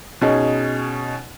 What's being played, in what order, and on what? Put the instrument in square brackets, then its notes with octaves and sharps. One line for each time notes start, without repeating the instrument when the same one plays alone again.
[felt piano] B2 C#4 D#4 G#4